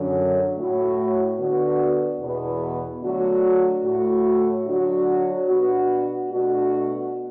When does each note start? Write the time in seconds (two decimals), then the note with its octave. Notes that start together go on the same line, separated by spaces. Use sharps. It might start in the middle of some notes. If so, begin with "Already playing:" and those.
Already playing: F#2 D3 F#3
0.57 A2 A3 F#4
1.39 D3 B3 F#4
2.20 E2 B2 B3
3.02 D3 F#3 A3 F#4
3.84 A2 A3 F#4
4.66 D3 F#3 D4 F#4
5.47 B2 B3 D4 F#4
6.30 B2 A3 D4 F#4